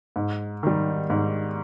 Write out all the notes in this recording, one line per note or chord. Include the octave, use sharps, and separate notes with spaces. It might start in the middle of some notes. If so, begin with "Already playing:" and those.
G#2
D#3 G3
G#2